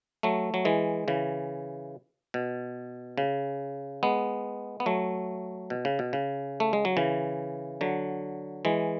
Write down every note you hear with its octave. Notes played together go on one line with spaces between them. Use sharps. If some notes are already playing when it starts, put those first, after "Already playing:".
F#3 A3
F#3
E3 G#3
C#3 E3
B2
C#3
G#3 B3
B3
F#3 A3
B2
C#3
B2
C#3
A3
G#3
F#3
C#3 E3
D3 F#3
E3 G#3